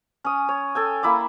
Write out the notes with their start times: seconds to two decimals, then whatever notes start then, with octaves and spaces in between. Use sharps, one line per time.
0.24 C#4 D#6
0.48 C#5
0.75 A4 G5 G#5
1.03 A#3 E4 B5 D6